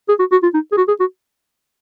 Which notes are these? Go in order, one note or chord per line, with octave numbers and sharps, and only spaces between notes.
G#4
F#4
F#4
F4
D#4
G#4
F#4
G#4
F#4